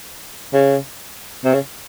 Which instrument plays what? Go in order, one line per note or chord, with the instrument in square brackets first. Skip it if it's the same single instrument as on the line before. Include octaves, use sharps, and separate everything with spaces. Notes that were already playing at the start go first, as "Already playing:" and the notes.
[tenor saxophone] C#3
C3
C#3